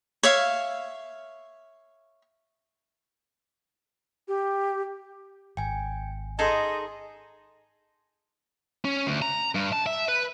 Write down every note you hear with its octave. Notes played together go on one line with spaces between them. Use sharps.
C#5 E5 F5
G4
G#1 G5 G#5
D#4 G#4 A4 D#5 A5 C6
C#4
D2
A#5
G2
A5
E5
B4